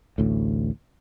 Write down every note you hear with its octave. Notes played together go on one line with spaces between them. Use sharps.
A1 D2 A2